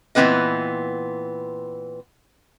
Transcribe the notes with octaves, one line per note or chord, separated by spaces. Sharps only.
A#2 E3 B3 C4 B4 D#5